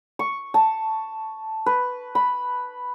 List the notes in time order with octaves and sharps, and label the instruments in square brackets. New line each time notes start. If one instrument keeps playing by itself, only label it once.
[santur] C#6
A5
B4
B5